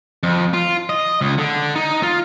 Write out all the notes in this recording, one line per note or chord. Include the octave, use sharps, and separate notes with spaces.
F2
F4
D#5
C#2
D3
D#4
F4